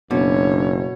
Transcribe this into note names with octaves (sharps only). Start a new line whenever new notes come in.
F#1 B2 D4 C#5